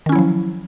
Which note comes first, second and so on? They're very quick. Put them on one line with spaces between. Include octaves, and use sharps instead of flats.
D#3 C#4 E4 F#3 F3